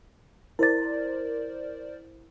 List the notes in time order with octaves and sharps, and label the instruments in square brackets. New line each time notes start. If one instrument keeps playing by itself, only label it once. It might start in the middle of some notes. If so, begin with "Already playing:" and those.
[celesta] E4 A6 [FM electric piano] A#4 C5 D5